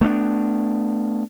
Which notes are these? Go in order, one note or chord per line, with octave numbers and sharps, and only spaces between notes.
A3 B3 C4 D4